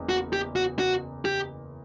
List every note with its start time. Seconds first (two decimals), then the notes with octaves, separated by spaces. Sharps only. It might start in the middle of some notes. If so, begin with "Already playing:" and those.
Already playing: F#1 E2
0.09 F#4
0.33 G4
0.56 F#4
0.79 F#4
1.25 G4